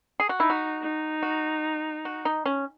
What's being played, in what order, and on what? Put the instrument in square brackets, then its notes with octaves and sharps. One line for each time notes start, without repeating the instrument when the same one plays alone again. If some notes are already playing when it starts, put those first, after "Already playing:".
[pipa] G#4
F#4
[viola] D#4 [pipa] E4
[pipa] F#4
[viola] D#4
[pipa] F#4
F#4
D#4
C#4